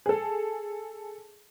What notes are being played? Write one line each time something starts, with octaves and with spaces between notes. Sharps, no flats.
G#4 A4